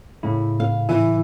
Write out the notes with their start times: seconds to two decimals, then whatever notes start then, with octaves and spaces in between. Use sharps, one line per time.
0.23 A2 C#3 E4
0.60 F5
0.89 E3